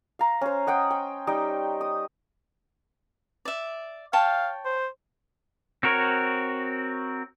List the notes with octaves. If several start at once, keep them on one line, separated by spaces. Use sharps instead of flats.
F5 A#5
C#4 C5
D#5 F#5 G5 D#6
G5
G3 D#4 D#5 G5
D#6
D5 E5
C#5 F5 G5 A5
C5
C4 F#4 A#4 C#5